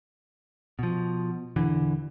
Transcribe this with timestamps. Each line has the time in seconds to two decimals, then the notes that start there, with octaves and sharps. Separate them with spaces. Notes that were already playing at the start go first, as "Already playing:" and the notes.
0.79 B2 F3
1.56 E1 D3 E3